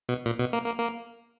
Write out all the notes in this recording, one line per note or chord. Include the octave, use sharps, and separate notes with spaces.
B2
A#2
B2
A#3
A#3
A#3